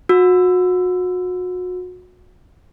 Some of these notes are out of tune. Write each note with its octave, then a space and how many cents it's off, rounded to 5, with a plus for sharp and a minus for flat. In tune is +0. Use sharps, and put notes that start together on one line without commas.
F#4 -30 E6 +10